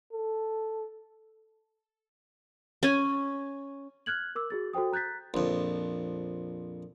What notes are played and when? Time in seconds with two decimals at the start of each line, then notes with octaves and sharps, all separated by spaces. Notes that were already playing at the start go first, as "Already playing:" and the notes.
0.12 A4
2.83 C#4 G#5
4.06 F6 F#6 G#6 F#7
4.35 A#4 D6 E6
4.50 F#4 G#4 A6
4.73 F#4 A4 C5 G5 D#6
4.92 A#5 F#6 G6 A6 B6
5.34 A#1 F2